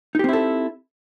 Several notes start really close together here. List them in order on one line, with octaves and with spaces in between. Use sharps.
D#4 G4 C4 E4 A4